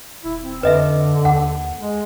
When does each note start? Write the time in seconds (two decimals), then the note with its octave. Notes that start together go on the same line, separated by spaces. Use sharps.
0.24 D#1 E4
0.41 C4
0.63 F2 D3 B4 D#5 E5
1.25 D#2 F#5
1.79 G#3